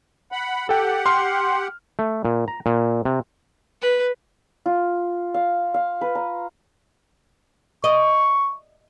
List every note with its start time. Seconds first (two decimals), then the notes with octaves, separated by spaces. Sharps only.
0.32 F#5 B5
0.69 G4 A4 F#5 G5
1.06 C6 F6
1.99 A3
2.25 A#2
2.48 A#5
2.66 A#2
3.05 C3
3.82 B4
4.66 F4
5.34 F5
5.74 F5
6.01 B4
6.15 A#5
7.84 D#5 C#6